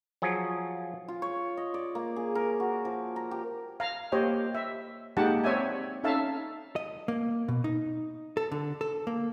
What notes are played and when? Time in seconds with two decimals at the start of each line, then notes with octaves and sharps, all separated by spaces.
0.22 F3 F#3 G#4
1.08 F4
1.22 C#5
1.57 D#5
1.74 D5
1.95 A#3
2.16 G#4
2.35 A#4
2.60 F#4
2.85 F3
3.16 A#5
3.31 G4
3.80 F5 A#5
4.12 A#3 G4 C5 C#5 D#5
4.55 E5
5.17 G#3 A#3 D#4 G4 F#5 A5
5.44 C4 C#5 D5 E5 G#5
6.04 C#4 D#4 A4 E5 F5 A5
6.76 D#5
7.08 A#3
7.48 B2
7.64 D#4
8.37 A4
8.52 D3
8.81 A4
9.07 A#3